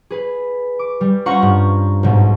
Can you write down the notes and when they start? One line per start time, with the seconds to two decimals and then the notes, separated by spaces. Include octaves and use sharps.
0.11 G#4 B4
0.79 D6
1.01 G3
1.26 C#4 F4 C5 F#5 A#5 C#6
1.42 G2
2.03 B1 G#2